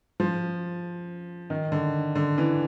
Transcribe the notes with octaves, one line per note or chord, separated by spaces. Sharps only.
F3
D#3
D3
D3
E3